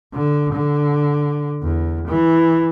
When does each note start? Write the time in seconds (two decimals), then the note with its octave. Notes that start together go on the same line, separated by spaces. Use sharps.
0.13 D3
0.53 D3
1.63 E2
2.07 E3